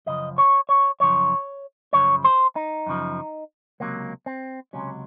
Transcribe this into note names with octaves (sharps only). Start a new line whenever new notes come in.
F#2 C#3 F3 D#5
C#5
C#5
F#2 C#3 F3 C#5
F#2 C#3 F3 C#5
C5
D#4
F#2 C#3 F3
C#2 C3 F#3 A#3
C4
C#2 C3 F#3 C#4